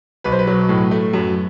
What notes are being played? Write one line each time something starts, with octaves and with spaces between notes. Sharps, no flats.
B1 B4
C5
B4
F#3
A2
A3
F#2